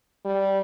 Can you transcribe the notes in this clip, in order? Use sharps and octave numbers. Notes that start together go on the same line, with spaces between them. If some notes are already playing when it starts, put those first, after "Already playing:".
G3